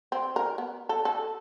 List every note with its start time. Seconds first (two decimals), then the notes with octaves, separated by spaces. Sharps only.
0.12 C4
0.36 A#4
0.58 B3
0.89 A4
1.05 A4